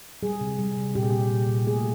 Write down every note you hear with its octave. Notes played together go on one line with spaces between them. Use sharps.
G3 G#4
C3
G3
C3
A#2 G4
G#4
A#2 G4
A#2
A#2
A3 G#4